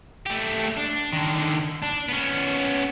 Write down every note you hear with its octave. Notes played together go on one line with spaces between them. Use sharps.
A3 G4
D4
D3 D#3
D4
B3 C#4